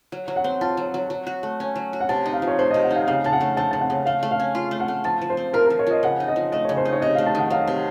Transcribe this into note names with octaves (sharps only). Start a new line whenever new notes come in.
F#3
F#3
F#5
C4
F4 A5
F#3
F#3
F#3
F#4
A3
C#4
F#3
F#4
F#5
C3 A5
D#4
F5
F3
C#5
A3 C5
C3 D#5
F#5
D#4 F5
C#3 F5
C#3 A5
F#5
A3
C4 A5
C#3 A5
F#5
C#3
A3 F5
A3
F5
C#4
F4
A3
F#5
A3
F3 A5
F3
C5
C4
F4 A#4
F3 A#4
C#5
F3 D#5
C#3 F#5
D#4
D#5
F3
A3 D#5
C#3 C#5
C5
D#4
C#5
C3 D#5
A3 F5
A5
D#3 F#5
F#3 F5
C3